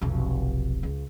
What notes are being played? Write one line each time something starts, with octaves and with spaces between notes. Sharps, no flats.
F1 B1
C#2